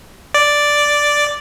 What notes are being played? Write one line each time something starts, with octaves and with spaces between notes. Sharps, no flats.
D5